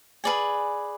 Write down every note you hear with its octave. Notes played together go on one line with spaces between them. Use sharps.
G#4 B4 D5 G#5